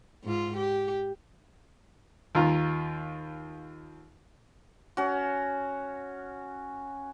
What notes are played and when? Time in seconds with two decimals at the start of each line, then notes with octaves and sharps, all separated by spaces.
0.24 G#2 F4
0.57 G4
2.35 D#2 F4 A#5
4.97 C#4 F#4